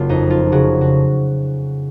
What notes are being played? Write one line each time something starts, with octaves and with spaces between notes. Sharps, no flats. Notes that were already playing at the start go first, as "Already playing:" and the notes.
Already playing: F#1 F4
F2 D#4
F4
C#3 F#4
F#4